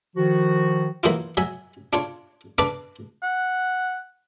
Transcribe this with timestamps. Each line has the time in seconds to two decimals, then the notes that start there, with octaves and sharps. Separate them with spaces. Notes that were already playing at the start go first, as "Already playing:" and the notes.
0.16 D#3 F3 F#4
1.03 E3 F#3 A#3 E4 F4
1.37 F#3 E5 G#5
1.93 D4 F4 C#5
2.58 D4 B4 D5 F5 A#5
3.22 F#5